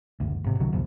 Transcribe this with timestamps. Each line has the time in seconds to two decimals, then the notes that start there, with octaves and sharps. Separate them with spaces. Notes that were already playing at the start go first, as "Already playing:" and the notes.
0.20 F#1 D2
0.44 G#1 C3
0.60 C2 D3 F#3
0.73 C2 F2 A#2